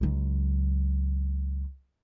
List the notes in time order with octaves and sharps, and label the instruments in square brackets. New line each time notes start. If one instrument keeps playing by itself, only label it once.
[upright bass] C#2 F#3